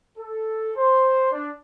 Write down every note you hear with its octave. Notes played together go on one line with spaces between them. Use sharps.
A4
C5
D4